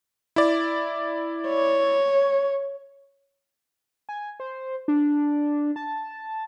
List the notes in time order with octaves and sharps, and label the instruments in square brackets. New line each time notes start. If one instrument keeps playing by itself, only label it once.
[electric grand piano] E4 D5
[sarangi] C#5
[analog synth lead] G#5
C5
D4
A5